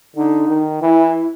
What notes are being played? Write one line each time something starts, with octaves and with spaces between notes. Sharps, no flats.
D3 D#4
D#3
E3 E4